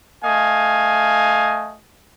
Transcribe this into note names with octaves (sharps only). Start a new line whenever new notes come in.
A3 D#5 F5 G#5